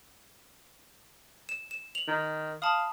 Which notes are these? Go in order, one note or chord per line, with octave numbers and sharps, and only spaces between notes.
E7
E7
F7 F#7
D#3
F5 A5 B5 D#6